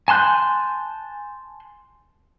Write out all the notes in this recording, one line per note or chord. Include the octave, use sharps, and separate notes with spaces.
G#5 A5 C6 F#6 G6